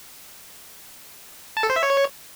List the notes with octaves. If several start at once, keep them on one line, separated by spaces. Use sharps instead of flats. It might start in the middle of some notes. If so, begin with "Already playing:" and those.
A5
A4
C5
E5
C#5